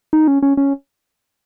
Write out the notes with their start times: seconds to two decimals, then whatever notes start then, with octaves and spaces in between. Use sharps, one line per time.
0.13 D#4
0.28 C#4
0.43 C#4
0.57 C#4